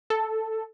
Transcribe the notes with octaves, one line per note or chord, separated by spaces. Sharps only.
A4